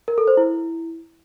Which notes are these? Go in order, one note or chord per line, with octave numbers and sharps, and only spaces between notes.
A#4
A4
C5
E4